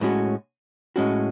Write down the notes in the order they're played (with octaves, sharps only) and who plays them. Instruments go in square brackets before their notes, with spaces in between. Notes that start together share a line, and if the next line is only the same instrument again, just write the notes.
[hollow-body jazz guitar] A2 G#3 C#4 F#4
A2 G#3 C#4 F#4